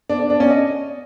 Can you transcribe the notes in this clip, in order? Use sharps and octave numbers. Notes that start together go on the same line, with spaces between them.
D4
D4
D4
C#4
D#5